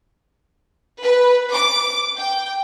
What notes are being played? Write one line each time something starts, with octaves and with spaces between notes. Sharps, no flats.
B4
D6
G5